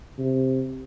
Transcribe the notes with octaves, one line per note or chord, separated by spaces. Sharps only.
C3